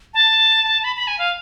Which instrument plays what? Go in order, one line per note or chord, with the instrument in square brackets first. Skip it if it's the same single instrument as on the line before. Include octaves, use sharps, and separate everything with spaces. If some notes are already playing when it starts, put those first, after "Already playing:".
[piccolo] A5
B5
B5
G#5
F5